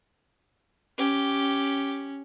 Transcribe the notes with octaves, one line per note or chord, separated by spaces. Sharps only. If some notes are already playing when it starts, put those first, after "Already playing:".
C#4 G4